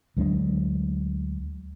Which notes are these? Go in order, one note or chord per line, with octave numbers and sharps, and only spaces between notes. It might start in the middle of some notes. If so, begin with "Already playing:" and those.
D2 F#3 G#3 D4